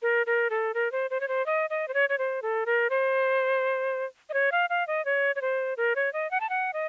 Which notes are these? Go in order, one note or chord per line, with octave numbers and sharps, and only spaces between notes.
A#4
A#4
A4
A#4
C5
C5
C#5
C5
D#5
D#5
C5
C#5
C#5
C5
A4
A#4
C5
D#5
C#5
F5
F5
D#5
C#5
C#5
C5
A#4
C#5
D#5
F#5
A5
F#5
D#5